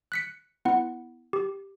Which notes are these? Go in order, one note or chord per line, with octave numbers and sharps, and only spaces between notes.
F#6 B6 C#7
B3 E4 F#5
G4